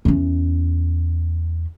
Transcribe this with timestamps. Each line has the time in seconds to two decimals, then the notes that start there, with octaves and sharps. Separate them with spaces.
0.05 E2 C#4